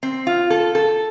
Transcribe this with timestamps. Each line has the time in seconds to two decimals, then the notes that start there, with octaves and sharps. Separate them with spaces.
0.03 C4
0.27 F4
0.50 A4
0.75 A4